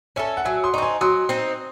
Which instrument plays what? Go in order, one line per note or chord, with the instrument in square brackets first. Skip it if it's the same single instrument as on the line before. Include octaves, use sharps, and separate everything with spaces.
[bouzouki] C#4 E4 A4 [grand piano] E5 G#5
[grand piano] F#5
[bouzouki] F#3 [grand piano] E5 G#5
[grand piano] C6 D#6
[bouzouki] D#4 [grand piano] C#6
[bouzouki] C4 [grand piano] G#5 C6
[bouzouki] F#3 [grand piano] C6 D#6
[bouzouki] C4 D#4